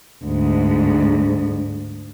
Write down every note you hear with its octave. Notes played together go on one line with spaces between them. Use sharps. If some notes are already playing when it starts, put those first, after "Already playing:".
D2 G#2